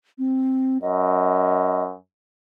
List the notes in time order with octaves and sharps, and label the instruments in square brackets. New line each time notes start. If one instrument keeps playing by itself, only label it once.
[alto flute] C4
[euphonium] F#2 [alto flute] D#5